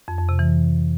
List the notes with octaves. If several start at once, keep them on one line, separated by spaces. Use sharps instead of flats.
F2
F2
C3
E3